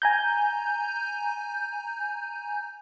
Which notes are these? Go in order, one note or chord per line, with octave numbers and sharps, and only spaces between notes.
G#5 A#5 G6